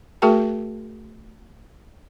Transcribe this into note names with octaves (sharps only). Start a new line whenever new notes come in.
A3 F#4 G#4 A#4 G5 A5